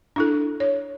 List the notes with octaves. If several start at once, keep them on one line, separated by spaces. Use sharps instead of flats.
D4 E4 A4
C#5